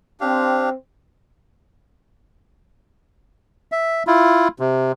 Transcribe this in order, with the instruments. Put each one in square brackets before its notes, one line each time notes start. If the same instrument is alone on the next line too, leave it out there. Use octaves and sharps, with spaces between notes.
[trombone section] C4 [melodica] D4 G4 F5
[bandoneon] E5
E4 F4
C3